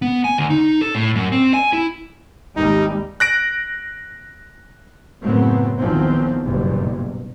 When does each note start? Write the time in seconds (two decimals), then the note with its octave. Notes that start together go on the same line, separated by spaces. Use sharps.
0.02 B3
0.24 G#5
0.38 D2
0.50 D#4
0.81 A4
0.95 A2
1.15 F#2
1.32 C4
1.54 G#5
1.73 E4
2.57 G#1 D#2 G3 D#4
3.20 F#6 A#6 D7
5.23 F#2 A2 C#3 F#3 B3 C4
5.80 A#1 E2 D#3 F3 F#3 C4
6.44 F#1 B1 G2 A#2